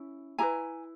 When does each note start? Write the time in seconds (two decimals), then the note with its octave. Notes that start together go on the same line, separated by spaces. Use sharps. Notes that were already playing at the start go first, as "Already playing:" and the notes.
Already playing: C#4 E4
0.38 E4 G4 B4 G#5 A#5